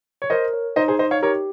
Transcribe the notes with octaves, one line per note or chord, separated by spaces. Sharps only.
C#5
A#4 C5 D#5
C#5
D#4 C5 D#5
G#4 C5
D#4 C5 D#5
C#5 F5
G4 A#4 C#5